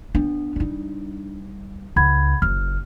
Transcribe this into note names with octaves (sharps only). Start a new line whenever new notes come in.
B3 D4
G3 D#4
C#2 F#5 B5 G#6
F#1 F6